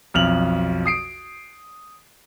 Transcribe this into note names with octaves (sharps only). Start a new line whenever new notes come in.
B1 F2 F6 F7 F#7
D#6 C7 D7